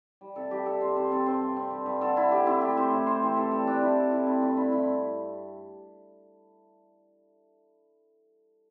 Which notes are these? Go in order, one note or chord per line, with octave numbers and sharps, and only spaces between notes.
G3
C3 A4
G3 G4
C3 A4
C3 C5
C3 C5
C4 A4
C4 C5
G2
C4
G2
G2
D3 A4
D3 E4
D3 G4
C4 E4
A3 G4
C4 C5
A2
C4 C5
E3 C5
C3 A4
G3 A4
C3 D4
A3 E4
C4 A4
C3 E4
C4 E4
G2 D4
C4 E4
G2 E4